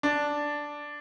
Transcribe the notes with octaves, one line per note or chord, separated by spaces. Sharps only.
D4